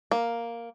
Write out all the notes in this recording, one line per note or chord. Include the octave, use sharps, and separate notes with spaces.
A#3